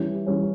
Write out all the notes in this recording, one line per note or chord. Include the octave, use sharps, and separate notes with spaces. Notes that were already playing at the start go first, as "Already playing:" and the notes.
Already playing: E3 G3 C#4
E3 G3 C#4